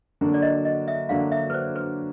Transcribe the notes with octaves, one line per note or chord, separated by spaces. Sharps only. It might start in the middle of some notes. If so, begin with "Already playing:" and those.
D3 F#3 A#3 D4 F#4
D5
D#5
D#5
E5
D3 F#3 A#3 D4 F#4 F5
E5
B4
C5
B4